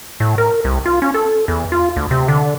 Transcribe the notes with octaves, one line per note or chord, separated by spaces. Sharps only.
A2
A#4
C2
F4
C#4
A4
E2
F4
D2
C3
D3